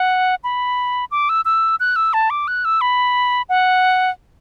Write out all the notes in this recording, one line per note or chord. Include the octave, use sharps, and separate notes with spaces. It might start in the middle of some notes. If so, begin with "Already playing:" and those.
Already playing: F#5
B5
D6
E6
E6
F#6
E6
A5
D6
F#6
E6
B5
F#5